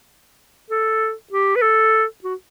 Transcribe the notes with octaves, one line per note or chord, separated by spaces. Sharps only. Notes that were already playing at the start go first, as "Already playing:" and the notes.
A4
G4
B4
A4
F#4